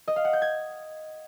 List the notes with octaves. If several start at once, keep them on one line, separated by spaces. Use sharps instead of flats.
D#5
F5
F#5
G6
G#6